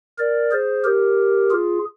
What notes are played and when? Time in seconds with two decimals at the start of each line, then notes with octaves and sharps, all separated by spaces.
0.19 A#4 D5
0.52 G#4 C5
0.85 G4 A#4
1.51 F4 G#4